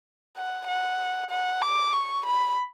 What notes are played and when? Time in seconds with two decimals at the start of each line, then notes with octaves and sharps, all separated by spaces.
0.36 F#5
0.68 F#5
1.30 F#5
1.62 D6
1.93 C#6
2.26 B5